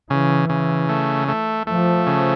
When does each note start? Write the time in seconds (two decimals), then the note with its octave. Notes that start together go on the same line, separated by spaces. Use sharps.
0.10 C#3 E3
0.49 C#3
0.89 A3
1.28 A3
1.67 F3 A3
2.07 C#3